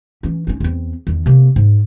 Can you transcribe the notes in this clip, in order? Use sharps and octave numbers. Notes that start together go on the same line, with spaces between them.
E3 C#4
C#4 D#4
E2 C4
E2 D#3
C3 A#3
G#2